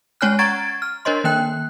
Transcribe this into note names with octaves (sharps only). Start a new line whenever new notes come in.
G#3 C#4 C#5 G#5 F6 F#6
F#5 A#5 C#6 G#6 A6 D7
F6
D4 A#4 C5 C#5 D#5 C6
D#3 A#3 G5 F#6